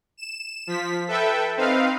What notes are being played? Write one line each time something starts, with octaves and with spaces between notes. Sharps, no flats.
E7
F3 B6
A4 B4 E5 G5
C4 D#4 B4 F5